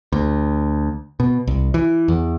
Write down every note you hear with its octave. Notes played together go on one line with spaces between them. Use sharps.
D2
B2
C2
E3
E2